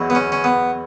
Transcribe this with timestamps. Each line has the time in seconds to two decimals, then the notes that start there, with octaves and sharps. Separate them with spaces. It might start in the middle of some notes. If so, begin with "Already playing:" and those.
Already playing: E2 B2 F#3
0.10 B3
0.15 C#4
0.32 C#4
0.44 B3